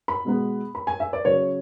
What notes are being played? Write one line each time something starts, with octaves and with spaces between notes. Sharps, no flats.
B5
B2 G#3 B3
B5
G#5
E5
D5
C#3 F#3 C#4 C#5